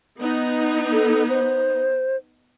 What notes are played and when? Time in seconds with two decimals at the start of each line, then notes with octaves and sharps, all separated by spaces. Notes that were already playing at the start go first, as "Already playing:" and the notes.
0.18 B3 D#4
0.92 A4
1.29 C5